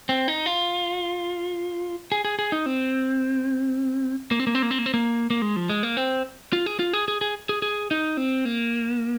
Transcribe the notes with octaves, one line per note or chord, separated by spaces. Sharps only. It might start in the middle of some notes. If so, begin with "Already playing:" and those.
C4
D#4
F4
G#4
G#4
G#4
D#4
C4
A#3
C4
A#3
C4
A#3
C4
A#3
C4
A#3
A#3
G#3
F3
G#3
A#3
C4
F4
G#4
F4
G#4
G#4
G#4
G#4
G#4
D#4
C4
A#3